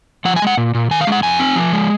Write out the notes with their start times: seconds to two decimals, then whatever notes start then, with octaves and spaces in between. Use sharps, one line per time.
0.25 F3 F#5
0.36 G#5
0.42 G#3 F#5
0.57 A#2
0.74 A#2
0.91 D#3 G#5
1.01 F5
1.07 G#3 F#5
1.23 F2 G#5
1.40 C4
1.56 F3
1.73 G#3